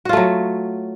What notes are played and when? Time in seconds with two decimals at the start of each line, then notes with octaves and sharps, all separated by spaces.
0.05 F#4
0.09 F4
0.13 A3
0.17 F#3